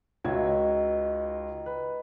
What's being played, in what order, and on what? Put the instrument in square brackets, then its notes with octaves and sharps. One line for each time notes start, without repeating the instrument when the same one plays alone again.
[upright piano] C#2 F#4 G#6 [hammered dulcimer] D#4 D#5 E5
[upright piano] B4